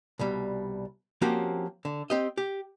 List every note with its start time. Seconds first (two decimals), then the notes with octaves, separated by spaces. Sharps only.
0.19 C2 B2 G3
1.22 F3 A#3 C4 C#4 F#4 G4
1.85 D3
2.10 C4 G4 D#5
2.37 G4